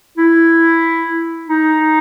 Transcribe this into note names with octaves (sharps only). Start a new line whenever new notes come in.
E4
D#4